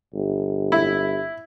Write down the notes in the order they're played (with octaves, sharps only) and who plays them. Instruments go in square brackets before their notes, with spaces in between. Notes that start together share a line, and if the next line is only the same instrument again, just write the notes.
[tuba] G1
[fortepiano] E4